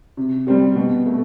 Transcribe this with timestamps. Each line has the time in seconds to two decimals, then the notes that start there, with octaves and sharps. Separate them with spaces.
0.17 C3
0.47 G3 C4 G4
0.76 B2
1.06 A3